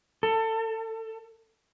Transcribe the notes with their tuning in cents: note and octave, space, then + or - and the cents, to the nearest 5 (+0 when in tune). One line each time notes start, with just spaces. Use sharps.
A4 +25